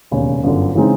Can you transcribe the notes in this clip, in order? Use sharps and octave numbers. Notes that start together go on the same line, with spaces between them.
E1 D#2 C#3
G1 F#2 D3
C#3 E3 G#3 C4 D#4